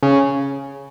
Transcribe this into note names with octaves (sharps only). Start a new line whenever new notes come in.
C#3